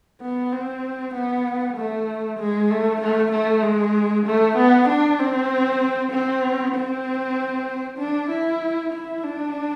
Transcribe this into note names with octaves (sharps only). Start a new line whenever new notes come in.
B3
C4
B3
A3
G#3
A3
A3
A3
G#3
A3
B3
D4
C4
C4
C4
D4
E4
E4
D4